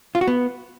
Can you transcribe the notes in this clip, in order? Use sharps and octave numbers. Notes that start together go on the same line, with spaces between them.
F4
F#4
B3